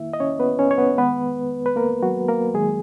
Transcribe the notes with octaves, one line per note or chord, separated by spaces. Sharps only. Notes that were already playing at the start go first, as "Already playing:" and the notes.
Already playing: D#3 A#3 E4 E5
D#5
C#4 C#5
B3 B4
C#4 C#5
C#5
B3 B4
D#3 G#3 B3 B4
B4
A#3 A#4
F#3 F#4
A#3 A#4
D#3 F#3 G#3 A#3 G#4